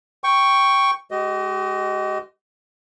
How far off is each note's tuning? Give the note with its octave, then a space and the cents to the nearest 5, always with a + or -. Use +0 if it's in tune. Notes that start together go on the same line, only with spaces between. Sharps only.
G5 +0 C#6 +0
G#3 +0 G4 -45 D#5 +0